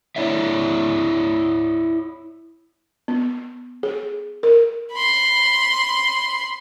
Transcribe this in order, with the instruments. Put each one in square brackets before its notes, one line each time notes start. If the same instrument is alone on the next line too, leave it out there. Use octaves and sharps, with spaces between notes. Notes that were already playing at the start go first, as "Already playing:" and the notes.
[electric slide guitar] E4 C#5 D5 E5
[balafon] B3
G#4
A#4
[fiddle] B5 C6